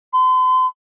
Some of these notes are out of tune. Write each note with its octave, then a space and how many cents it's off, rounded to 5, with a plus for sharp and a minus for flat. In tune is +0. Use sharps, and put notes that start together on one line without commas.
C6 -40